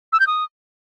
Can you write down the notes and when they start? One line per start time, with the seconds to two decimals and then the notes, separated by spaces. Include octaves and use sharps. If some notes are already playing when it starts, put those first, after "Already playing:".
0.13 E6
0.20 G6
0.27 D#6